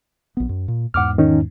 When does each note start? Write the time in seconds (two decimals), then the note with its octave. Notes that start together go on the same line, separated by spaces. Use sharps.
0.37 A#1 B3
0.49 F#2
0.68 A#2
0.94 E2 G#2 F#5 D6 F6
1.18 D#3 C#4 D#4